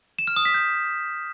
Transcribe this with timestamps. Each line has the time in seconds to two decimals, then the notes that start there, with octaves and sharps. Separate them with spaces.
0.19 E7
0.28 F6
0.36 D#6
0.45 B6
0.54 G6